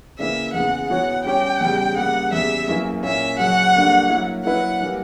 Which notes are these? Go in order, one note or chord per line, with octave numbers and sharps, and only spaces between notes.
C#3 E3 A#3 E5
E2 C#3 E3 F#5
E3 B3 F#4 C#5 F#5
G3 C#4 G4 C#5 G5
E2 C#3 G3
C#3 G3 A#3 F#5
E2 C#3 G3 E5
F#2 E3 A#3 E4
A#2 A#3 C#4 E5
F#2 C#3 F#3 F#5
D3 G3 A#3 D4
F#3 A#3 E4
F#3 A#3 E4 B4 F#5
E3 G3 A#3